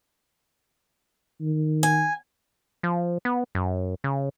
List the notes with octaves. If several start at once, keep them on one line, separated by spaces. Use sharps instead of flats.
D#3
G#5
F3
B3
F#2
C#3